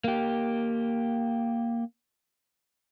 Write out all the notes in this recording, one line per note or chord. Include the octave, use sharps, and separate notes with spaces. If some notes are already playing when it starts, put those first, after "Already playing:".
A#3 G4